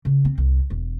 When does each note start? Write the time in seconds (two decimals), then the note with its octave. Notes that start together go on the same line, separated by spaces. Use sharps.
0.05 C#3
0.25 C4
0.38 C2
0.70 E1